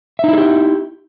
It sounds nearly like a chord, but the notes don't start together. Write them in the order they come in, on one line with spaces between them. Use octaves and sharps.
E5 D#4 E4 G#4 G4